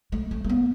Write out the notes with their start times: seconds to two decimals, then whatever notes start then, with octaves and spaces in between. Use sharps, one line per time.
0.12 A3
0.31 A3
0.44 A3
0.49 B3